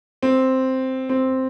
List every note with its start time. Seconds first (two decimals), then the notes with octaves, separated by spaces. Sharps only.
0.23 C4
1.09 C4